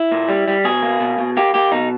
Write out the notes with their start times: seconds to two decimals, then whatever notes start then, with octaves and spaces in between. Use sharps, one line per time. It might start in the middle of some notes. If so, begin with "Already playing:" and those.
Already playing: E4
0.12 A#2
0.29 G3
0.48 G3
0.65 B2 G#4
0.83 A#3
1.00 B2
1.18 B2
1.37 A#3 G4
1.54 A#3 G4
1.72 B2 D#4